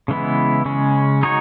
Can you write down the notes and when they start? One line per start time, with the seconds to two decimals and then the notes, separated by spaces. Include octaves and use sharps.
0.08 C#3 E3 G#3 B3 E4
0.65 C#3 G#3 C#4
1.23 G#3 D#4 F#4 C#5